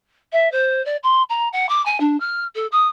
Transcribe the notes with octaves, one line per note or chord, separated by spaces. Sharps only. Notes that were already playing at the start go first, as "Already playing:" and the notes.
E5
C5
D5
C6
A#5
F#5
D6
G#5
D4
F6
A4
D#6